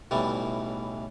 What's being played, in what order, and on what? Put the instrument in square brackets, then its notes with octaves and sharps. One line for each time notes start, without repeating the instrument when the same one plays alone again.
[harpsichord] B1 A2 E3 G3